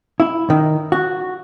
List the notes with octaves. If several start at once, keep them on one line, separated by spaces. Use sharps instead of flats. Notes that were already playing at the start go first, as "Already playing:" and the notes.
E4
D#3
F#4